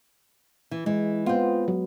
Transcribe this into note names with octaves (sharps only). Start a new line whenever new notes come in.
E3
E3 G#3
B3 C4 F4
F#3